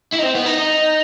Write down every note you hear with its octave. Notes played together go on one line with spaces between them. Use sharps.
E4
D#4
C4
B3
D#4
D#4